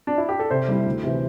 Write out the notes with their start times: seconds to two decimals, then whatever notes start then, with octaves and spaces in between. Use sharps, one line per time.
0.07 D4
0.18 E4
0.29 G4
0.39 A4
0.51 C3 C5
0.68 G3 E4 G4
0.86 D2
1.04 C3 E3